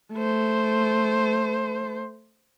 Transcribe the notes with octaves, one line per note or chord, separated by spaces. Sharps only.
A3 C5